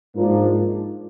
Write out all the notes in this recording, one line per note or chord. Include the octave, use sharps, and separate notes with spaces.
G#2 F3 A#3 D4 F4